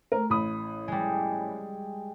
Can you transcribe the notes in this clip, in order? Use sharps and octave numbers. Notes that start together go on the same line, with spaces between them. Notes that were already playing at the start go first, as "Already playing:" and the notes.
A3 A#4
A1 B5 D#6
G3 G#3